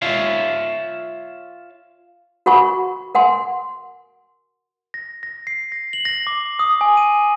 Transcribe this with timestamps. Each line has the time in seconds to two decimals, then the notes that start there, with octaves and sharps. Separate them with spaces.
0.02 F4 C#5 E5 F5
2.46 F#4 A#4 F#5 G#5 B5 C#6
3.15 A#4 F#5 G#5 C6
4.94 A#6
5.23 A#6
5.47 C7
5.72 A#6
5.93 F#7
6.05 A#6
6.27 D6
6.59 D#6
6.81 G#5
6.97 D#7